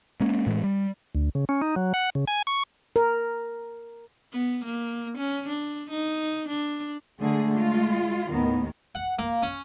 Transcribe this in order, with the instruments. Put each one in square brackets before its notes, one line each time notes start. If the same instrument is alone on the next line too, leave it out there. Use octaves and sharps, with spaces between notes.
[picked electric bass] G#3 A#3 C#4
A2 E3 G#3
G3
[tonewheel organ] D2
C#3
C#4
D#4
F#3
F#5
C#3
G#5
C#6
[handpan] A#4
[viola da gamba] B3
A#3
C#4
D4
D#4
D4
[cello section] D3 G#3 G#4 [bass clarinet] A3
[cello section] G#3 F4
[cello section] D#2 A2 D#3 [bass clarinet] B3
[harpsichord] F#5
A#3
C#4